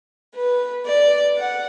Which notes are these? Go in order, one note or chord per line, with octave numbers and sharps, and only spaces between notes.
B4
D5
F#5